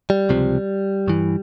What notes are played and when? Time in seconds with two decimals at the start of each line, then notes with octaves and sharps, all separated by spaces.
0.10 G3
0.29 C#2 C3 F3
1.08 G2 E3